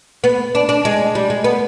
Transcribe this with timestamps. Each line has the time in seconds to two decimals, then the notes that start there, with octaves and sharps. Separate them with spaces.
0.24 B3
0.55 D4
0.69 D4
0.85 G#3
1.15 G3
1.30 G#3
1.44 B3